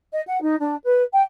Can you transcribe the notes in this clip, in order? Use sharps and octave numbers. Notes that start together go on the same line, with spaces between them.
D#5
F#5
D#4
D4
B4
G5